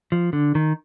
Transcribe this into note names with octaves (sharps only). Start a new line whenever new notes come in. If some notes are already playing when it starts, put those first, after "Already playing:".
F3
D3
D#3